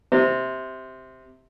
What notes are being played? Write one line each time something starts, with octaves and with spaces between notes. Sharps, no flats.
C3